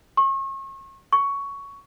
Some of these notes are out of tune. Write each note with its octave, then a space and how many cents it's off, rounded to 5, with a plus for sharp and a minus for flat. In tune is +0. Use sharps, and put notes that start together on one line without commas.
C#6 -35
C#6 +10